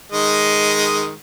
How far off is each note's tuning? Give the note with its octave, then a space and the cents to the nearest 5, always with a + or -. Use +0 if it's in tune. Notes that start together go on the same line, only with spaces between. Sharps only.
D#3 +0 G#3 +0 D#5 +0